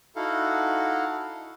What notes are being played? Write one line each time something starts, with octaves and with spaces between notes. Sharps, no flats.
D#4 E4 F#4 A4 F5 F#5